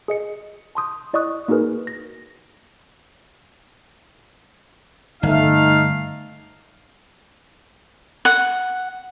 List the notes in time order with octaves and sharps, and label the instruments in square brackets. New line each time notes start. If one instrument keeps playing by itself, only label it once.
[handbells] G#4 D#5 C#7
A5 C6 D#6 G6
E4 D5 D#5 C#6 D#6 F#6
A#3 D#4 F#4 G#4 A#4 B4
A#6
[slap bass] G1 [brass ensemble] A3 D#4 F5
[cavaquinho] F#5